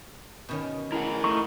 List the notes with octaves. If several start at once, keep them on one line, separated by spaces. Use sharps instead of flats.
B2 D#3 C#4
A2 E4 G#4 A#4 F#5
A3 D#4 C#6